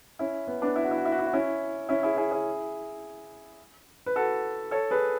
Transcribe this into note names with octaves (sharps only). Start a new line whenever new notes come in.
C#4 E4
B3
B3 D4
E4
F#4
E4
F#4
E4
F#4
E4
F#4
C#4 E4
C#4 E4
E4 G#4
E4 G#4
E4 G#4
B4
F#4 A4
A4 C#5
G#4 B4